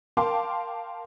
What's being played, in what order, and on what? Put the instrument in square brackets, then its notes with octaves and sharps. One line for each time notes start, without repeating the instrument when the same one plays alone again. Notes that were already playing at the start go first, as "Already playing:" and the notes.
[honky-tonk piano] A#4 F5 G5 A5 C6 D6